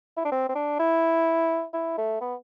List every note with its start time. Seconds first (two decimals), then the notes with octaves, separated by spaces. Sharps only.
0.17 E4
0.25 D4
0.32 C4
0.49 C4
0.55 D4
0.79 E4
1.73 E4
1.98 A3
2.21 B3